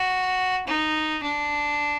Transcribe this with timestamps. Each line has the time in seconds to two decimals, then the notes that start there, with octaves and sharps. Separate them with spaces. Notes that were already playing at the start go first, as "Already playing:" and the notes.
Already playing: F#4
0.67 D#4
1.23 D4